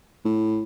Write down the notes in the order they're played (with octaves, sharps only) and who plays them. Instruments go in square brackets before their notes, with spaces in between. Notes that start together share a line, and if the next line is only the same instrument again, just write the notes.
[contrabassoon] A2